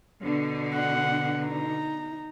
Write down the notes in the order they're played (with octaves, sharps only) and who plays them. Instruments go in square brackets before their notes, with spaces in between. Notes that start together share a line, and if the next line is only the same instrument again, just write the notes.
[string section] B2 D3
[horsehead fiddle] F#5
D#4 A#5